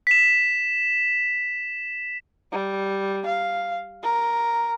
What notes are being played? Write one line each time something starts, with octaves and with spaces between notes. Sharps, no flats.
B6 E7
G3
F5
A#4